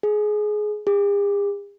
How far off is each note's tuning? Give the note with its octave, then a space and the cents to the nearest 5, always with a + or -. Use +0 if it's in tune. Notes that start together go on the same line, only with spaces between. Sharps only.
G#4 +20
G#4 -45